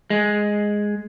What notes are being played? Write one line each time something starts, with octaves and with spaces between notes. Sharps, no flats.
G#3